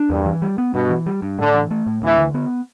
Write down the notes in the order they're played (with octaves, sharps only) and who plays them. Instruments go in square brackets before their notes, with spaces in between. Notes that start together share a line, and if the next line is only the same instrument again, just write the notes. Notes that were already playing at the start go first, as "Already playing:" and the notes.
Already playing: [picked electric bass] D4
[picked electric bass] E2 [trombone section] G2
[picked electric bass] E3
G3
B3
[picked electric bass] G2 [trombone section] B2
[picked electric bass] E3
G3
G2
[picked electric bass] A2 [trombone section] D3
[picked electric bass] E3
A3
A2
[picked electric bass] D2 [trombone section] E3
[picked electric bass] D3
B3